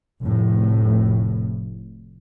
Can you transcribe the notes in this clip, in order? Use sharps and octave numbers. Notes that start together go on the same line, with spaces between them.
F1 A2